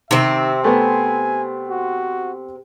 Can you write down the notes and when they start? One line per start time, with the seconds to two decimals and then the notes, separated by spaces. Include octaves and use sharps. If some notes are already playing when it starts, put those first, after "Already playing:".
0.11 C3 D#3 C4 E5
0.64 A3 B3 G#5
1.70 F#4